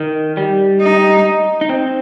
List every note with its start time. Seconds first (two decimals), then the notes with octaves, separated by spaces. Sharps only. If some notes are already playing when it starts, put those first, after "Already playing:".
Already playing: D#3
0.37 G3
0.81 D#4
1.61 D#4
1.69 C4